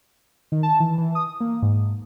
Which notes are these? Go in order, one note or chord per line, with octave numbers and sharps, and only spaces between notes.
D#3
A5
E3
E3
D#6
A#3
G#2